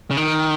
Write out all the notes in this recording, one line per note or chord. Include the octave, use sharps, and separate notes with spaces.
C#3
D#3